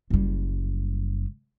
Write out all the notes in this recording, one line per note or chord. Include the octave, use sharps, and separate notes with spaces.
F#1 G3